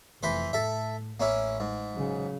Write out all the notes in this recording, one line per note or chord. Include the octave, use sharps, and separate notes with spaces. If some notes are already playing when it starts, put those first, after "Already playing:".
F1 E3 B4 C5
A2 A4 E5
A1 A#3 C#4 E4
G#2
C#3 F#3